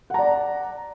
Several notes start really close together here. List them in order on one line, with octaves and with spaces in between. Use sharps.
F#5 A#5 D5